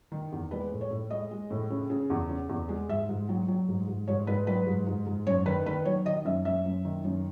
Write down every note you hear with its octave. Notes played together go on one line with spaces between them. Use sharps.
D#3
E2
G#3 B4
A2
C#5
A2
G#3 D#5
G#3
A2
C#3
C#3
E2
C#3
E2
G#3
G#2 E5
G#2
F#3
F#3
G#2
G#2
G#2 C#5
G#2 B4
F#3 B4
G#2
G#2
G#2
F#2 C#5
D#3 B4
D#3 B4
F#3 C#5
D#3 D#5
F#2 E5
F#2 E5
F#2
D#3
F#2